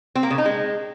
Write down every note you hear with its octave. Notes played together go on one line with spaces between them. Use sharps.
C4
A#3
C#3
D#4
G#3